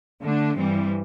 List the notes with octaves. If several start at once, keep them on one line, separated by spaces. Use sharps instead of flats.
D3 A3 D4
G2 E3 G3 C4